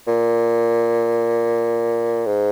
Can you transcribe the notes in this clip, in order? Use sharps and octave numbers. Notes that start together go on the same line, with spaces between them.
A#2
G#2